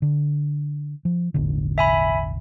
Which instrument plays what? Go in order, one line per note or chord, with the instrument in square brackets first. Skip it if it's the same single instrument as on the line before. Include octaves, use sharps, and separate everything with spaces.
[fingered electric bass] D3
F3
E1 A1 D3
[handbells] E5 G#5 B5